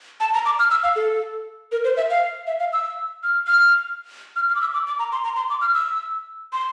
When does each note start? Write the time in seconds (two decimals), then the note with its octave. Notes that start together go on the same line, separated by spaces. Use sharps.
0.20 A5
0.34 A#5
0.45 D6
0.59 F6
0.71 E6
0.83 F5
0.96 A4
1.72 A#4
1.84 C5
1.97 E5
2.10 F5
2.47 E5
2.60 F5
2.73 E6
3.23 F6
3.47 F6
4.36 F6
4.49 F6
4.55 D6
4.61 E6
4.73 D6
4.87 D6
4.99 A#5
5.12 C6
5.24 A#5
5.36 C6
5.50 D6
5.61 F6
5.74 E6
6.53 C6